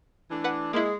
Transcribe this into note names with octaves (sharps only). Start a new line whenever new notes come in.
E3 A3 D4
B4 F#5
G#3 A#3 E4